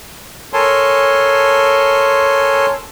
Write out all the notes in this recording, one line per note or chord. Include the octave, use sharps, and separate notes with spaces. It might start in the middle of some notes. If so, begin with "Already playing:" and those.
A4 A#4 C#5 G#5 A5 C6